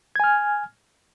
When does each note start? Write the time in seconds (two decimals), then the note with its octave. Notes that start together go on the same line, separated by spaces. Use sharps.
0.16 G#6
0.20 G#5
0.24 F6